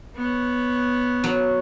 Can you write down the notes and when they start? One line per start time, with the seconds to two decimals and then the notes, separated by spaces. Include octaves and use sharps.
0.16 B3 C#5
1.24 F#3